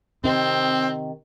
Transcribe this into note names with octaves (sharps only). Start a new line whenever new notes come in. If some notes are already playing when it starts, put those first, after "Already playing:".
C3 D#3 C4